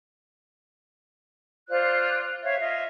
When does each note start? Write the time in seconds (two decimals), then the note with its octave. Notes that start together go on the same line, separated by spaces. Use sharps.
1.68 F4 C5 D5 F#6
2.42 C#5 E5 F5
2.59 F4 D#5 E5